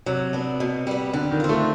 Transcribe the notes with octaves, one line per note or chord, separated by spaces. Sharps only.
C3 F#3
B3 D4
B2
G3 B3
D3 G3
D#3
C4 F4
A3